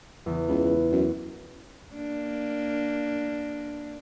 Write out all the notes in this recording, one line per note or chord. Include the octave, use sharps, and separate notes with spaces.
E2 C#3
C#2 B3
F#2
A#3 D4